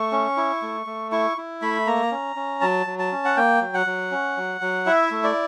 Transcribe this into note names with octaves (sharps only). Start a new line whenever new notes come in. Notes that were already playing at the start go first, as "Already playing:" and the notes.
Already playing: A3 C#6
C#4
E4
A3
A3
E4 C#6
E4
A3 B5
A#3 A#5
C#4
C#4
F#3 A5
F#3
A5
C#4
F#5
A#3 G5
F#3
F#5
F#3
C#4
F#3
F#3
E4 E5
A3
D5